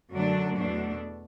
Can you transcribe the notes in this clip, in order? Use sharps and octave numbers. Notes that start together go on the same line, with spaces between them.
F#2 D3 F#3 A3 D4
E2 B2 A3 D4